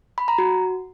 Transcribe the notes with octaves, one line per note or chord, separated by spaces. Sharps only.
B5
A#5
F#4